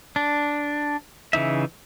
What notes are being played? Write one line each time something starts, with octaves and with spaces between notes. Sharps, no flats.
D4
C#3 E3 D#4 E5